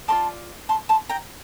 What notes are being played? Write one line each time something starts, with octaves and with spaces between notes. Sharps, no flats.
F4 A#4 D5 A5 C6
A5 C6
A5 C6
G5 A#5